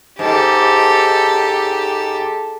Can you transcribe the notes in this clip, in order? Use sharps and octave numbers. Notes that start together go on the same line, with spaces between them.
G#2 G4 A4